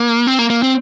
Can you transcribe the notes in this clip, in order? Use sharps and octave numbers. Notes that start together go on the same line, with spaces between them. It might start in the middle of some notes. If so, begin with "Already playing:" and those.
Already playing: A#3
C4
A#3
A#3
C4